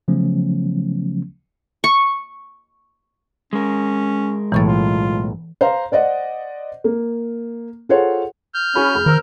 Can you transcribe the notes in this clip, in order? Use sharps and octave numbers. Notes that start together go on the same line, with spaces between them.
C#3 F3 F#3 A3 B3 C#4
C#6
G#3 C#4 A#4
B1 A2 E3 C#6 A6
F4
C5 F5 A#5
C5 D5 D#5 F#5
A#3
F4 G#4 A4 C5 C#5 F#5
F6 G6
C#4 F#4 G#4 B5
F1 G#4 B5
D#3 A#4 C5 E6